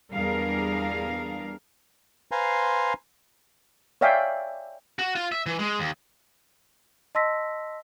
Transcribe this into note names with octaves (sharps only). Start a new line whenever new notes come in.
E2 G3 D4 G#4 A#4 F5
B4 C5 F5 G#5 A#5 C6
C#5 D5 E5 F5 G5 G#5
F#4
F4
E5
E3
G#3
D#2
D#5 A5 C6 E6 A#6 B6